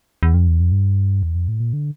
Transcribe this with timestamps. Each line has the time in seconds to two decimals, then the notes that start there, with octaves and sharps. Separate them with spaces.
0.23 E2
0.34 F2
0.48 E2
0.60 F2
0.72 G2
1.23 E2
1.35 F2
1.48 A2
1.60 A#2
1.73 D3